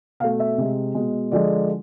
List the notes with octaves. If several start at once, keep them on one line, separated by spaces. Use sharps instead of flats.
B2 A3 F5
E5
C3 G#3
B2 G#3
D3 F3 G#3 D5